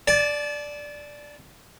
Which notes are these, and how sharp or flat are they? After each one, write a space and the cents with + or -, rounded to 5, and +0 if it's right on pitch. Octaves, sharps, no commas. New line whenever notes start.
D5 +0 A5 -30